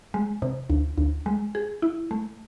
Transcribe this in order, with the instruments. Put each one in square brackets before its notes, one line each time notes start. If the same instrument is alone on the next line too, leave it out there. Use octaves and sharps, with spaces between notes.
[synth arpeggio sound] G#3
C3
D2
D2
G#3
G#4
E4
A3